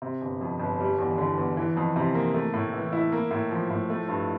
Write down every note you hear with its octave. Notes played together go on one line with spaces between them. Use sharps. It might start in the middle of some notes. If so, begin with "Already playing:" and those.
C3
G1
F2
G1
G3
E2
D3
E2
E3
F2
C3
A#3
A3
A2
E3
E4
A#3
A2
F3
A2
A3
G2